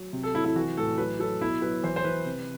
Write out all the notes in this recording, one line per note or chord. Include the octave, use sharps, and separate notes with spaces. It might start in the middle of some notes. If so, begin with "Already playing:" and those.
Already playing: F#3
C3
A4
F#3 E4
E4
E3 F#4
A2 A4
F#3 B4
F#3 A4
B2 E4
F#3 B4
E3 C5
C5
E3 B4
C3